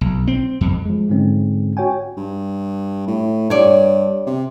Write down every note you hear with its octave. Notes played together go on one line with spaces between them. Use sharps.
B1
C4
F2
F3 G#3
G#2 D3 G#3 C4 C#4
F#4 C#5 G5 G#5
G2
A2
G2 C#5 D5
C3